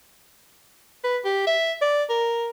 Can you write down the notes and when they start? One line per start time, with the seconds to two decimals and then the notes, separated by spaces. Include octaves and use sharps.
1.04 B4
1.25 G4
1.47 E5
1.81 D5
2.10 A#4